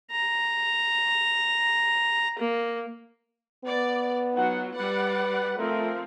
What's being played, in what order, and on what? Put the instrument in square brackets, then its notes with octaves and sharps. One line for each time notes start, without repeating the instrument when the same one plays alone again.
[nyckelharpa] A#5
A#3
[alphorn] B3 [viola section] D5
[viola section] F#3 F4 [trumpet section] D#4 F#5
[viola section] G3 D5 F#5 [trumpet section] B4
[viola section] F3 C4 [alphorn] A3 [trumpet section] F4 A#4